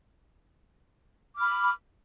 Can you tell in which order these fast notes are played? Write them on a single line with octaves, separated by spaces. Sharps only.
D6 F6 B5